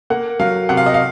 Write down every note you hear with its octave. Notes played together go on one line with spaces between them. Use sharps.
A#3 F#5
F#3 F5
C3 F#5
F5
D#5
F5